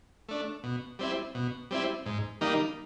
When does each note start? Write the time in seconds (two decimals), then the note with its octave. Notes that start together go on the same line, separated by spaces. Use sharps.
0.29 A3 D4
0.64 B2
0.99 G3 C4 E4
1.35 B2
1.71 G3 C4 E4
2.06 G#2
2.41 D#3 G3 A#3 D#4